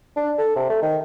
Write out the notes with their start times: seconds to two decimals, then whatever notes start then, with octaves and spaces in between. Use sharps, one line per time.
0.16 D4
0.38 A4
0.56 C3
0.69 A3
0.82 D#3